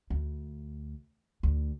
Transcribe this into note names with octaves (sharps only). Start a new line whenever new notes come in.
D2
D2